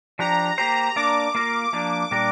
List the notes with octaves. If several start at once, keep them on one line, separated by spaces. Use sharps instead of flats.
F3 D4 G4 A#5
A#3 G4 C5 A#5
A#3 D4 A#4 D5 D6
A#3 F4 A#4
F3 A#3 D4
A#2 G3 D4 A#4